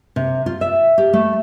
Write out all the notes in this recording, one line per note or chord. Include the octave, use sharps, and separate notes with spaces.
C3
F4
E5
G4
A3